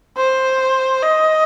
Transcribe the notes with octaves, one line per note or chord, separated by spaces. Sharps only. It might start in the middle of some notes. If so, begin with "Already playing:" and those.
C5
D#5